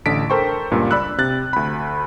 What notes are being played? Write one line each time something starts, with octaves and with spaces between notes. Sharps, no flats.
A1 D3 D4 A5 B6 D7
A4 A#4 C5 G5 C#6
C#2 G2 A#2
D5 B5 E6 F#6
C3 F#6 A6
D2 B5